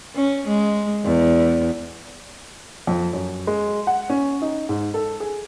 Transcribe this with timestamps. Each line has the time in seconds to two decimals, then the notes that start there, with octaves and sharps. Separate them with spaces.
0.16 C#4
0.48 G#3
1.05 E2
2.87 F2
3.13 F#2
3.47 G#3
3.87 F#5
4.10 C#4
4.42 D#4
4.69 G#2
4.94 A4
5.20 G#4